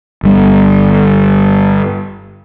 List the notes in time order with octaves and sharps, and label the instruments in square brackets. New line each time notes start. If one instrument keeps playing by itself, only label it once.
[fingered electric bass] G1 G3